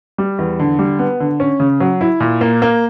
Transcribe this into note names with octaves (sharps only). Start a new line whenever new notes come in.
G3
E2
D3
G3
B3
D3
C#4
C#3
F#3
E4
A#2
A#3
A#3